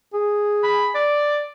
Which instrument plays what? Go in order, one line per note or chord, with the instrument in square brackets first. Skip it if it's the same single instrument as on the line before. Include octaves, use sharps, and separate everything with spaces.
[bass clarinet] G#4
[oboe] B5
D5